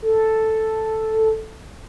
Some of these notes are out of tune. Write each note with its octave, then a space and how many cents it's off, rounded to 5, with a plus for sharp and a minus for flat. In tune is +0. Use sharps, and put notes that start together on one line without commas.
A4 +0